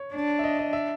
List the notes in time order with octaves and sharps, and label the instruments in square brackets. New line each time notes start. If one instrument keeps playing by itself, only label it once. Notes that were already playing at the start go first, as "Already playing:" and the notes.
Already playing: [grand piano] C#5
[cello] D4
[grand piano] E5
D#5
D#5
E5